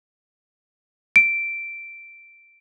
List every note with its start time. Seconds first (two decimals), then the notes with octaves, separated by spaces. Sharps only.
1.16 D7